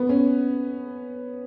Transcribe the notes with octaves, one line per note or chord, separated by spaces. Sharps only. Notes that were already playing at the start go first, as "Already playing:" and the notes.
Already playing: B3
C#4